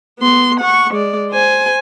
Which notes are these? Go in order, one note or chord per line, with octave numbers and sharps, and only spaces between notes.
B3 C6
F#5 C#6
G#3 D5
C5 G#5